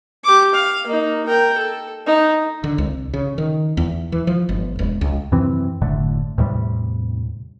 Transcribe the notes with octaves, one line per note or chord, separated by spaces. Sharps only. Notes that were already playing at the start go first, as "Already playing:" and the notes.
G4 D6
F5
A#3 D#4
A#4 G5
A4
D#4
D3
C2
C#3
D#3
E2
E3
F3
G1
E1
C#2
F#2 C3 E3 C4
F#1 A2 D3 A3
E2 A2 C3 G3